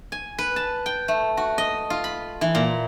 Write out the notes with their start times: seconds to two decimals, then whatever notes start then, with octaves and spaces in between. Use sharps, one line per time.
0.12 G#5
0.38 B4
0.56 A5
0.86 G5
1.08 A3
1.37 F#4
1.58 D#5
1.90 F4
2.04 B5
2.41 E3
2.55 A#2